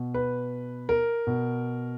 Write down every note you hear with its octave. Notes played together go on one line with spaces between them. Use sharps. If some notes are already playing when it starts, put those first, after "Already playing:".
Already playing: B2
B4
A#4
B2